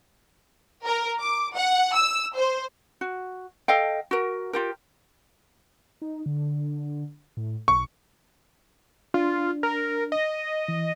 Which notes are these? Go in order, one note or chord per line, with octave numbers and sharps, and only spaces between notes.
A#4
D6
F#5
E6
C5
F#4
A4 D#5 F5 G5
F#4 A#4
F4 G4 A#4
D#4
D3
A2
B1 C#6
D4 F4
A#4
D#5
E3